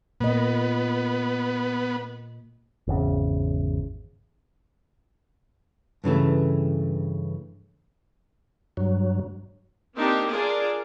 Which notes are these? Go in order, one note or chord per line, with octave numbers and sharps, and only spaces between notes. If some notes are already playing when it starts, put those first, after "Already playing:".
A#2 A#3 B3 D#5
G#1 E2 C#3
G2 C#3 E3 A3
G2 F#3
A#3 C4 D4 D#4 G4
D4 F4 G#4 A#4 D5